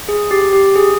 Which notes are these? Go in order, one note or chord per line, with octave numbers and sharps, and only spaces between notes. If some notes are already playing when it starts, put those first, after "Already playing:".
G#4
G4
G4
G#4